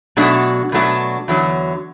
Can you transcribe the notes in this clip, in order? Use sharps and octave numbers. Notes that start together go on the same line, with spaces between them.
B2 F#3 A3 D4 F#4
B2 F#3 A3 D4 F#4
E2 D3 F#3